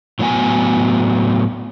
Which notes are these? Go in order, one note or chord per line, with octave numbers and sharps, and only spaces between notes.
A2 F#3 B3 G#5